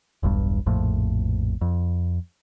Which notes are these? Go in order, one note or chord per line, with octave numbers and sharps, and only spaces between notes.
E1 B1 G2
A#1 F2 A2
F2